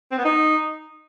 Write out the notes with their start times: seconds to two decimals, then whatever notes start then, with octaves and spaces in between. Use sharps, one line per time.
0.11 C4
0.18 B3
0.25 D#4